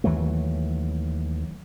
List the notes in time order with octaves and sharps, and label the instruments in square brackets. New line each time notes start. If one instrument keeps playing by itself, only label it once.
[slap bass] D#2 E3 F#3 A3